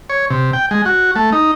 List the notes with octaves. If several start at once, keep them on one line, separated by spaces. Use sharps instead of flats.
C#5
C3
G5
G#3
F#4
A3
D#4